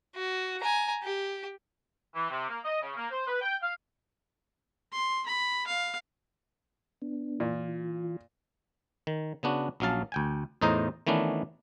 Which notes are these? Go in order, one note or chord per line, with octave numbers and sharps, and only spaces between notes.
F#4
G#5 A#5
G4
E3
C3
A#3
D#5
C#3
A#3
C5
B4
G5
F5
C6
B5
F5
B3 D4
A#2 E3 F4
D#3
C#3 B3 D4 F#4
A#1 F#3 C#4 F5 A5
D2 G5 G#5
E2 A2 D#4 C5 D#5 A#5
D#3 E3 A3 B3 C#4 D4